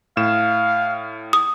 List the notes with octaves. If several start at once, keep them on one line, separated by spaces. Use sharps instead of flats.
A2 F5 E7
D#6